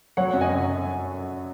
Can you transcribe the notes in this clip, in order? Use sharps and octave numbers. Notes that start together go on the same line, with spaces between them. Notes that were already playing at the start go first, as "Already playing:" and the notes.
F#3 C#5 F#5
F#2
D#5 G#5
F#3